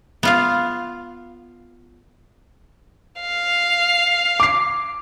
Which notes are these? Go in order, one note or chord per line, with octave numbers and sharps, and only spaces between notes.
B3 F4 F5
F5
D6 C7